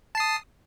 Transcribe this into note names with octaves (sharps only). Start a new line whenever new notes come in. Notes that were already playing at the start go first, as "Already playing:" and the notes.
A5 D#6 C7